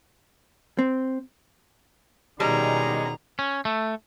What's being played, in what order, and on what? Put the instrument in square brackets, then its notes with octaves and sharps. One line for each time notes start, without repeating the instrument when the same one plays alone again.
[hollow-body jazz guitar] C4
[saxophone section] E2 G#3 C#4 [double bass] B2 D#3 [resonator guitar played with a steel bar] G3 [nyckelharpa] A#5
[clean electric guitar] C#4
A3